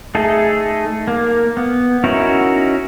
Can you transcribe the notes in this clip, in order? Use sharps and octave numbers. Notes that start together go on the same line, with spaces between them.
A3 D#4 G#4 A4
A#3
B3
C#4 D#4 E4 F#4 A#4